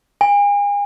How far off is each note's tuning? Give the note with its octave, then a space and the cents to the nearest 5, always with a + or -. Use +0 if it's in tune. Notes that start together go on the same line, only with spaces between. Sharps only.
G#5 -35